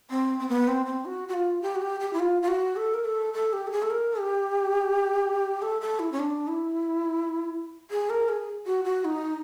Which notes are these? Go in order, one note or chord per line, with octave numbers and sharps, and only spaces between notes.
C4
C4
B3
C4
C4
F#4
F#4
F4
G4
F#4
G4
G4
E4
F4
F4
F#4
A4
A#4
A4
A4
G4
A4
G#4
A4
A#4
G4
A4
A4
E4
C#4
D4
E4
G#4
A#4
G#4
F#4
F#4
D#4